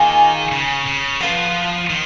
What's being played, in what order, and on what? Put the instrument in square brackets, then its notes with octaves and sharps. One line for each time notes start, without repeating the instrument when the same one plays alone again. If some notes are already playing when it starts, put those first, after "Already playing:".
Already playing: [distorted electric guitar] D#3 [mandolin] A#3 F4 G#4 D#5
[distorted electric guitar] C#3
C#3
[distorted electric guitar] F3 [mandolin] B3 F4 B4
[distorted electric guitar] D#3